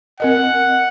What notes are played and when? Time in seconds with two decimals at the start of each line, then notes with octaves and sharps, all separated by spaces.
0.20 C4 A#4 D#5 F#5